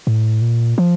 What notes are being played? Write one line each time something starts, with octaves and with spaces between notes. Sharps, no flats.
A2
A#2
F3